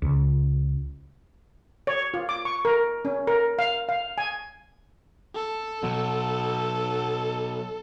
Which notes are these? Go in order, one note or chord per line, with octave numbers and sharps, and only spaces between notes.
C#2
C#5
F4
D6
C#6
A#4
C#4
A#4
F5
F5
G#5
A4
B2 F#3